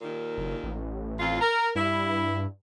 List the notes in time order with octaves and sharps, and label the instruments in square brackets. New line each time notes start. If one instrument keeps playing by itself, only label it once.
[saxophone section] D#2 A#2 D#3
[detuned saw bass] F#1
A1
[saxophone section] F2 F4
A#4
[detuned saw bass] G2 [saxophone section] E4